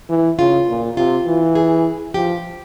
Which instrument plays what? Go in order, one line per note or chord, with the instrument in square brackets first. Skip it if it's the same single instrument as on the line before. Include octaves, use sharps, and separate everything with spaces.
[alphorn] E3
[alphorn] C#3 [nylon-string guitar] F4
[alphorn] A#2
[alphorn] C3 [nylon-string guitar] F4
[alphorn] E3
[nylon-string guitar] G#4
[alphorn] F3 [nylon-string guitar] G4